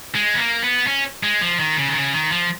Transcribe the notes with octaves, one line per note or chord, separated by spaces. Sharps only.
G#3
B3
A#3
B3
C#4
G#3
F3
D#3
C#3
D#3
C#3
D#3
F3